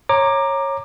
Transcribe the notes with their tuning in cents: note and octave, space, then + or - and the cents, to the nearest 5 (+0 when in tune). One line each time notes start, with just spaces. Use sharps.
C#5 -15 A#5 +0 D6 +20